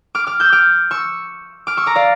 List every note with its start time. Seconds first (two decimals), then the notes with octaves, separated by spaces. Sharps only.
0.15 D6 F6
0.27 D6 F6
0.40 E6 G6
0.52 D6 F6
0.91 C#6 E6
1.67 D6 F6
1.77 C#6 E6
1.86 A#5 D6
1.95 D5 F5